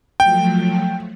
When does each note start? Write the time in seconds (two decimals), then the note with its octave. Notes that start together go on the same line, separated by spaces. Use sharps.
0.20 F3 F#3 A3 G5